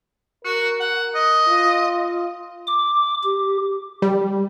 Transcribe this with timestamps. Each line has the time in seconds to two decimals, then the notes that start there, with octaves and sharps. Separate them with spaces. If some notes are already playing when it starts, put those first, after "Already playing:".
0.44 F#4 A#4
0.80 F#5
1.15 D#5
1.49 F4
2.67 D6
3.24 G4
4.02 G3